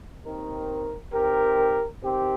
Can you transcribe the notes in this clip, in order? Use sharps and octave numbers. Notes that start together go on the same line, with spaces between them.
D#2 D#3 C4 D#4 A#4
D#3 C4 G4 A#4
D#3 C4 G4